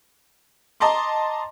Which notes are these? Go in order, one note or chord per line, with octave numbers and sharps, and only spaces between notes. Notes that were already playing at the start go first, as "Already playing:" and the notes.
D#5 A5 A#5 C6 D6